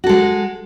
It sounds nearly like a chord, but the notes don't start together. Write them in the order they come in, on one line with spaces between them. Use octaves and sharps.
F#4 A4 G#3